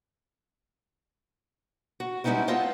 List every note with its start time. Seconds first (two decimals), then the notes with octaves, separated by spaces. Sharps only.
2.00 F#4
2.24 G3 G#3 B3 C#4 D#4 E4
2.48 B3 C4 F4 D#5 A5